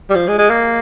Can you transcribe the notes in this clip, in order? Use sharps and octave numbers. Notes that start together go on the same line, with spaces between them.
G3
F3
G#3
G#3
A#3